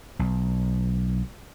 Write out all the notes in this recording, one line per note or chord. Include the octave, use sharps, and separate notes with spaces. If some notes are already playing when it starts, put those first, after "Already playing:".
B1